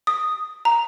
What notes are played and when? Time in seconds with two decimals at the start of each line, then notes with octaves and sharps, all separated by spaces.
0.07 D#6
0.65 A#5